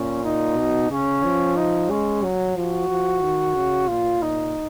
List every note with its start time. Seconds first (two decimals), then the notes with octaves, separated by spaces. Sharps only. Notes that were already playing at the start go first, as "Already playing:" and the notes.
Already playing: A#2 C#4
0.24 D#4
0.58 B2
0.91 C#3 C#4
1.24 F3
1.57 D#4
1.90 G#3 C#4
2.23 F#3
2.56 F3 F#4
2.90 F3
3.22 D#3
3.55 C#3
3.88 A#2 F4
4.22 D#4